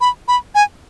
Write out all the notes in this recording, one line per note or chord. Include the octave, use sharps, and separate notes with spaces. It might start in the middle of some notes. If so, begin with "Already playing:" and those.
B5
B5
G#5